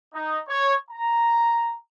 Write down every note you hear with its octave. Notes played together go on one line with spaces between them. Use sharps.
D#4
C#5
A#5